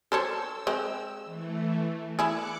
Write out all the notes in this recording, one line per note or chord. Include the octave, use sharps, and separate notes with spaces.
A4 C5 C#5 E6
G#3 C4
E3 A3
E4 G#4 D6 F#6 C#7